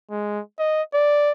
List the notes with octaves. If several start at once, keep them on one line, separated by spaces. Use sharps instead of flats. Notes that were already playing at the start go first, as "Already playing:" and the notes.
G#3
D#5
D5